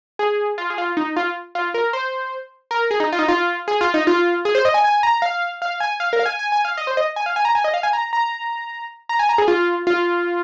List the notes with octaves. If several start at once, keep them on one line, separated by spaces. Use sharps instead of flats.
G#4
F4
G#4
F4
D#4
F4
F4
A#4
C5
A#4
G#4
D#4
F4
D#4
F4
G#4
F4
D#4
F4
G#4
C5
D#5
G#5
G#5
A#5
F5
F5
G#5
F5
A#4
F5
G#5
G#5
G#5
F5
D#5
C5
D#5
G#5
F5
G#5
A#5
G#5
D#5
F5
G#5
A#5
A#5
A#5
G#5
A#5
G#4
F4
F4